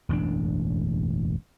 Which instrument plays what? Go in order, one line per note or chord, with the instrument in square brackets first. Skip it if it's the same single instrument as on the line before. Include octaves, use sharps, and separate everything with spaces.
[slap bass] E1 A1 F#2 D4